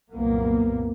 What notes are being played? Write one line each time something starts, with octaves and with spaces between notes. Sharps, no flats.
C2 F#2 A#2 A#3 B3